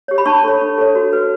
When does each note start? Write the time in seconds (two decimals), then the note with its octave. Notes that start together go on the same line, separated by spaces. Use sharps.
0.08 G4 C#5
0.18 B5
0.26 D4 A5 C#6
0.44 A4 C#5
0.62 D4
0.78 A4 C#5
0.95 F#4
1.13 B4